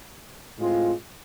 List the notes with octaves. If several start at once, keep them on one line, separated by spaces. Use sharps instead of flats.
A2 G#3 C4 F4